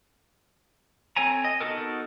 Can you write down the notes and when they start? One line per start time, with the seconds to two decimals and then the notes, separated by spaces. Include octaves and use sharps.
1.16 C4 A4 C#5 G#5 A#5
1.45 D#5
1.61 B3 D#4 F#4 A4 A#4